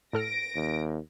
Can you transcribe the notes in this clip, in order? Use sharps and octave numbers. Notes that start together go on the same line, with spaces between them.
A2 A4 F6 A#6 D7
D#2